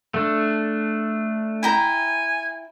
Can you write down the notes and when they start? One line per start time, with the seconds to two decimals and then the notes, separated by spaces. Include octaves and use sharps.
0.14 A3 D4
1.63 E4 G5 G#5 A#5